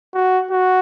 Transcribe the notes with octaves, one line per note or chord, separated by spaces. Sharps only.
F#4
F#4